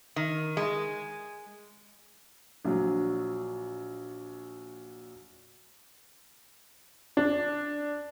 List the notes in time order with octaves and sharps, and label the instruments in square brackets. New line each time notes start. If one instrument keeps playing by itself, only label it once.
[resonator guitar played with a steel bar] D#3
G#3
[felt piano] A#1 F#3
[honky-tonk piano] D4